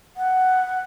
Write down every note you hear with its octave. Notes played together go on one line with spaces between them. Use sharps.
F#5